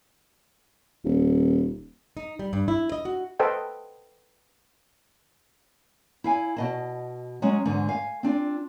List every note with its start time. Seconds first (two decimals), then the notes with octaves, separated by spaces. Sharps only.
1.04 D#1
2.17 D#4
2.39 G3
2.53 G2
2.68 E4
2.92 D#5
3.05 F#4
3.39 A4 B4 C5 D#5 G5
6.24 E4 F5 G#5
6.57 B2 D#5 A5
7.42 F#3 G#3 C#4
7.65 E2 G#2 D3
7.88 F5 G#5
8.23 C4 D4 F4